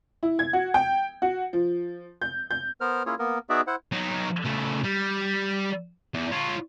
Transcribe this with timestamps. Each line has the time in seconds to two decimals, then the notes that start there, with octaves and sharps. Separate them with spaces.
0.23 E4
0.39 G#6
0.53 F#4
0.74 G5
1.22 F#4
1.53 F3
2.21 G6
2.51 G6
2.81 B3 A#4 C5 F6
3.06 A#3 C#4 E4 F4 G#4 C#5
3.19 A#3 B3 A#4
3.50 B3 D#4 F#4 G#4 D5 E5
3.67 E4 C5 F#5
3.92 F#3 D#4
4.45 C#3 A3
4.84 G3
6.14 E2
6.32 F4 C#5